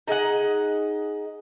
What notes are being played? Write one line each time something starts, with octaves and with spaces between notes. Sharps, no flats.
D#4 G#4 D#5 F#5